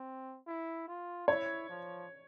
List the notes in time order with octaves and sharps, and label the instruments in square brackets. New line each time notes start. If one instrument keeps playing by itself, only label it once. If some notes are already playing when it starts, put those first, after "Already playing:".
Already playing: [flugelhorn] C4
E4
F4
[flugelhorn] E4 [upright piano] C#5
[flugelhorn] F3